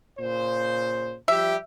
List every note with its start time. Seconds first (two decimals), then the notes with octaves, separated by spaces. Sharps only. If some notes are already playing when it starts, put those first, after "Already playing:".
0.19 A#2 C#3 C5
1.28 F3 G3 G4 E5